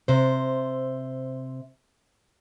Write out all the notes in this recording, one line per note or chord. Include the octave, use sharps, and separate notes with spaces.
C3 C5